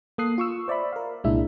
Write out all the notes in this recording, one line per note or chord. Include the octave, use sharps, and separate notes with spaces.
A#3 A4 D#6 F#6 C7
F4 C#6 E6
C5 D5 E5 B5
A#4 F5
C2 A#2 G#3 D4 E4 E5